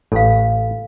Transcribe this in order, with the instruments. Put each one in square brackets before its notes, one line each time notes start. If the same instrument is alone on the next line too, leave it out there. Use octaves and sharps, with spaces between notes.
[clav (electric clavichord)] A1 A2 [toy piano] A4 F5